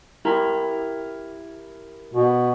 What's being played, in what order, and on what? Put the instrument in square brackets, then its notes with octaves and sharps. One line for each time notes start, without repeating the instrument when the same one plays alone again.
[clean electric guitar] E4 G4 A#4
[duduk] B2